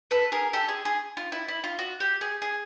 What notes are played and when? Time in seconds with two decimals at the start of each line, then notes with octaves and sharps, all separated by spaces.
0.11 A4 B4
0.32 G#4 A#4
0.53 G4 A4
0.68 G#4
0.85 G#4
1.17 F4
1.32 E4
1.48 E4
1.64 F4
1.79 F#4
2.00 G4
2.21 G#4
2.42 G#4